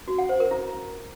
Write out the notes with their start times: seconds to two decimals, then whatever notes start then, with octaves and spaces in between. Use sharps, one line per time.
0.08 F#4
0.18 F#5
0.29 C5
0.40 A#4
0.51 E4